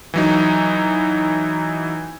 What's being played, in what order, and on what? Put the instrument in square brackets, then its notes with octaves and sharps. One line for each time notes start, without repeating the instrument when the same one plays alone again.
[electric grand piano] E3 F#3 D#4